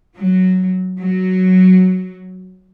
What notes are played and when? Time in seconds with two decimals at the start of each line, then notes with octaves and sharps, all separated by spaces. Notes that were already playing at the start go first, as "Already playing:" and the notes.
0.16 F#3
0.99 F#3